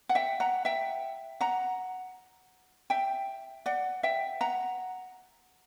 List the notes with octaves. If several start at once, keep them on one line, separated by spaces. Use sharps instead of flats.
F#5
E5 G5
F#5 A#5
E5 G5
F#5 A#5
E5 G5
D5 F#5
E5 G5
F#5 A#5